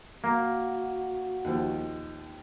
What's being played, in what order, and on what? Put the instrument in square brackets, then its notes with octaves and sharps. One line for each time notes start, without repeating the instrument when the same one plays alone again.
[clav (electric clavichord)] A#3 [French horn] F#4
[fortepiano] D#2 F3